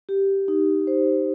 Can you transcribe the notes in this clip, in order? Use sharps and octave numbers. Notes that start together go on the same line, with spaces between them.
G4
D#4
C5